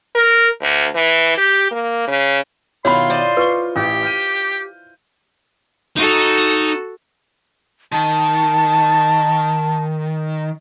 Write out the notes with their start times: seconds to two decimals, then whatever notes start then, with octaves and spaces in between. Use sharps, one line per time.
0.15 A#4
0.62 D2
0.95 E3
1.38 G4
1.71 A#3
2.08 C#3
2.85 B2 D#3 E4 F4 C#5 B5 C6
3.10 C5 D5 D#5
3.37 F4 B4 C#6 G7
3.76 A1 G4
4.03 F6 G6 D#7
5.97 D#4 F#4 A4
7.92 D#3 A5